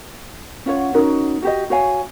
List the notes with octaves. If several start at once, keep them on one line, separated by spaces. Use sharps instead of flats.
C#4 F4 C#5 F#5
C#4 D#4 F#4 A#4
F#4 G4 D#5
F#4 C#5 F5 G#5